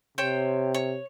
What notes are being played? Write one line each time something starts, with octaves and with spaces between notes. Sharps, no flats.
C3 C5 C#5 G5
C#5